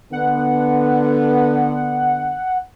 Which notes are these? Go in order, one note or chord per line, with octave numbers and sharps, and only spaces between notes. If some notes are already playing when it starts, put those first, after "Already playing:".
D3 B3 F#5